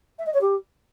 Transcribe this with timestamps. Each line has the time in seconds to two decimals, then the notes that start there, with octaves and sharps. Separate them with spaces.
0.19 E5
0.26 D#5
0.34 C#5
0.41 G4